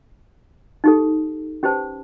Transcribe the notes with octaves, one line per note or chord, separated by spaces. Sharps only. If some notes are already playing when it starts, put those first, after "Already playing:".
D#4 G4 A4
C#4 G4 B4 C5 A5